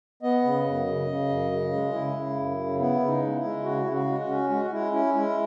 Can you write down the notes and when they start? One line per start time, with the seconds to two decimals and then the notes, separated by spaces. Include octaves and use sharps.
0.23 B3 D#5
0.44 C#3
0.66 F#2
0.87 C#3
1.08 C#3
1.29 F#2
1.51 C#3
1.73 G#3
1.93 C#3 E4
2.14 C#3
2.37 F#2
2.58 C#3
2.79 B3 E4
3.00 C#3
3.07 D#4
3.22 G#3
3.36 E4
3.43 G#3
3.64 C#3 F#4
3.84 C#3 E4
3.93 F#4
4.07 G#3
4.21 F#4
4.28 C#4
4.50 G#3 F#4
4.65 F#4
4.71 G#3 E4
4.92 C#4 E4
5.14 G#3 E4